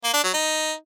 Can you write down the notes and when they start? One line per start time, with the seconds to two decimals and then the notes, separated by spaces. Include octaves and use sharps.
0.04 A#3
0.14 D4
0.24 F#3
0.34 D#4